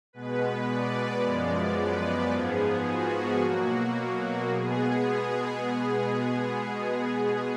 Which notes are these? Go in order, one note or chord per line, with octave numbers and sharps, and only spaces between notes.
B2 G#3 B3 B4
D5
F#2 F3 G#3 B3 D5
B4
G#2 F3 B3 G#4
F#4
B2 F#3 A#3
B2 G#3 B3 G#4